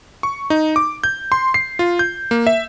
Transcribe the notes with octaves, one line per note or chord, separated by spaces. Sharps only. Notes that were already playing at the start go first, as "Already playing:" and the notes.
C#6
D#4
D6
G6
C6
C7
F4
G6
A#3
E5